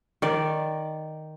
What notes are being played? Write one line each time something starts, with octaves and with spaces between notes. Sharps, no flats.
D#3 D5